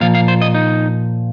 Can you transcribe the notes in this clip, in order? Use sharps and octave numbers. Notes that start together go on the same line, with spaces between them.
A#2 F3 F5
F5
C5
D#5
D#4